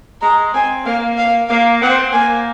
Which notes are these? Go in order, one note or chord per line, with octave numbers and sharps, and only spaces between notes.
G#3 A#5
C4 G#5
A#3 F5
F5
A#3 F5
C4 F#5
A#3 G#5